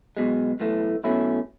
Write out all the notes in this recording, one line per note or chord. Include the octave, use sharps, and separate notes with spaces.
B1 B2 G#3
B1 A2 E3 A3
B1 B2 A3 C#4 E4